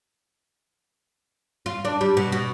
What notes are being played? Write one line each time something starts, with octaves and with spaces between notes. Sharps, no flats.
F4
D4
G3
B2
B2